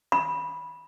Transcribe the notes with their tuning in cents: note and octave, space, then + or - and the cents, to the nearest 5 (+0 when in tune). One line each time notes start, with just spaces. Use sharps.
B5 -10